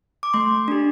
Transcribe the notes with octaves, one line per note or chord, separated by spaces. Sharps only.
D6
A3 C6
D4 G4